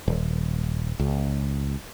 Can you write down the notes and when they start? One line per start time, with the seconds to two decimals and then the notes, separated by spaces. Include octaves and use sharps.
0.08 D#1
0.99 C#2